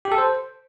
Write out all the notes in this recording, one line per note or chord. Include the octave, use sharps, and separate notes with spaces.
G4
A4
C5